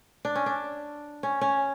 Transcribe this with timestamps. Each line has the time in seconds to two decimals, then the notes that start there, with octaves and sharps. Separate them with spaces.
0.25 D4
0.35 C#4
0.46 D4
1.23 C#4
1.41 C#4